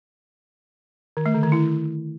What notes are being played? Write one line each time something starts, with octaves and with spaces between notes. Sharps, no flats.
D#3
A3
D3
D#3
E4